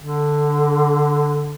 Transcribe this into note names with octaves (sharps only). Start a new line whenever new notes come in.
D3